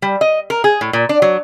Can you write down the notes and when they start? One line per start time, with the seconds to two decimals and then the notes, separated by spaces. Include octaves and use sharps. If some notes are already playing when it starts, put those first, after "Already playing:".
0.02 G3
0.21 D#5
0.50 A#4
0.64 G#4
0.81 A2
0.93 A#2
1.09 D4
1.22 F#3